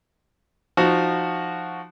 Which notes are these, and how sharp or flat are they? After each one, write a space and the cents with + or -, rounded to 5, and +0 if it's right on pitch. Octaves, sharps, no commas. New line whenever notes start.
F3 +0 D#4 -20 F#4 +0